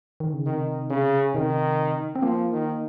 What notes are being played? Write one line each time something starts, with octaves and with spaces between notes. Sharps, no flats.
D#3
C#3
C3 D#3
C#3
C3 D#3
C4
F3 A#3
D#3